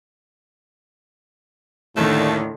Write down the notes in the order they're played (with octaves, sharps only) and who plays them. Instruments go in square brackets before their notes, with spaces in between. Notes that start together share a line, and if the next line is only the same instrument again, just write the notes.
[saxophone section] D#2 A3 [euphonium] A2 [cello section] D3 D#3